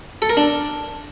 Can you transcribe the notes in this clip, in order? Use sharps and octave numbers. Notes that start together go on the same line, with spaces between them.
A4
A#4
D4